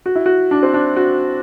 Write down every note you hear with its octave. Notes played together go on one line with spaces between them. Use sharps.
F#4
E4
F#4
D4
C4
D4
F#4